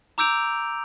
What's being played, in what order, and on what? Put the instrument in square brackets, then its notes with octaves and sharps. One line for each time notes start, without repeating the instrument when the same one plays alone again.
[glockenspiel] A#5 D6 E6 G6 D7 F7